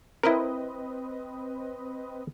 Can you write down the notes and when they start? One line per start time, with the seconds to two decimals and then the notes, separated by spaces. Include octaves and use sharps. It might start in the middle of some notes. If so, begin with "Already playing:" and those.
0.23 C4 E4 A#4 B4 D#5